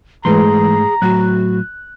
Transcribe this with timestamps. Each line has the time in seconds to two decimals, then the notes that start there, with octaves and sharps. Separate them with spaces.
0.25 G#2 E3 G#3 A3 G#4 B4 A#5 C6
1.02 A2 F#3 F#4 F#6